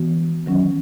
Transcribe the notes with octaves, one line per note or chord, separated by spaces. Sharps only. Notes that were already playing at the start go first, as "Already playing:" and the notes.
Already playing: E3 G#3 B3 F#4
D#3 F#3 C#4